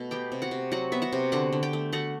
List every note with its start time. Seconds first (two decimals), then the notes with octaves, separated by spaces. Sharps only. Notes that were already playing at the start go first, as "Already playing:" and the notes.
Already playing: B2 A3
0.11 B3 G4 G5
0.32 C3
0.42 F#4 F#5
0.51 C3
0.72 F#3 F#4 F#5
0.92 B3 E5
1.02 F#4 F#5
1.12 C3
1.32 D3 F#4 F#5
1.53 D3
1.63 G4 G5
1.73 A3
1.92 A3 F#4 F#5